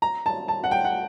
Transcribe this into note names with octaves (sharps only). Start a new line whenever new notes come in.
A#5
A5
A5
F#5
G5
F#5